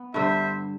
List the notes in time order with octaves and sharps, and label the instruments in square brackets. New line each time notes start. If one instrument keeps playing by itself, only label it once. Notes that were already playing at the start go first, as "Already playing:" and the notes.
Already playing: [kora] B3
[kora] G2 D3 G3 [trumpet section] C5 E5